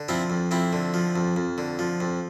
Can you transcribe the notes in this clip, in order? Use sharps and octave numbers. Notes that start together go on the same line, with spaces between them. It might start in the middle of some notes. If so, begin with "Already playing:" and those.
Already playing: D3
F3 C4 E4
F2
F2 C4 E4
D3
F3
F2
F2
D3
F3
F2